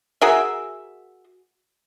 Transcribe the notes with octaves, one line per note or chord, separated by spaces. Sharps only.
F#4 G#4 A#4 E5